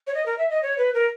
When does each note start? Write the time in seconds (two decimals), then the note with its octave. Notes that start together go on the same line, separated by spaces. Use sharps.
0.07 C#5
0.14 D#5
0.26 A#4
0.38 E5
0.50 D#5
0.63 C#5
0.78 B4
0.94 A#4